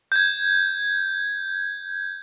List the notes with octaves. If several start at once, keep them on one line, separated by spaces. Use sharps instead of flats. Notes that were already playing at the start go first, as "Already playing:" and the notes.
G6 G#6